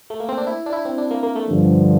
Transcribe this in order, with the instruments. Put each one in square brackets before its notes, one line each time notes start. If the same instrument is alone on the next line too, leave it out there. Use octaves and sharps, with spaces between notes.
[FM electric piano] A3
A#3
C4
D4
E4
D4
E4
C4
D4
A#3
A#3
A3
[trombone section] G2 D3 F3